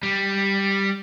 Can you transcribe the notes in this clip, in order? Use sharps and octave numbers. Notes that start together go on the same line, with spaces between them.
G3